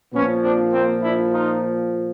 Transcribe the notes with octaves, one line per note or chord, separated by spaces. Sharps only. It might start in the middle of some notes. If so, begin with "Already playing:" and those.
A#2 F3 B3 C#4
C4 D4
A#3 C4
D4 E4
D#4 F4